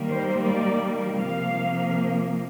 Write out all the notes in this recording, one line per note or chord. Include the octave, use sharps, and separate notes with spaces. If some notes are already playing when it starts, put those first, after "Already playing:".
Already playing: D#3 G3 A#3
C5
D5
C3 F3 A#3 F5